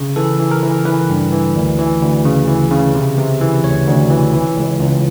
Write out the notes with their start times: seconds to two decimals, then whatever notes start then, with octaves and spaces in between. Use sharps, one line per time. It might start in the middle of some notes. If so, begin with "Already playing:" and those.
Already playing: C#3
0.16 E3 A4
0.40 E3
0.51 A#4
0.63 E3
0.86 E3 B4
1.09 G2
1.32 E3
1.55 D2
1.79 E3
2.02 D2
2.25 C#3
2.48 E3
2.71 C#3
2.95 C3
3.18 C3
3.41 E3
3.64 D2 C#5
3.87 D2
4.10 E3
4.33 E3
4.57 C#2
4.80 C#2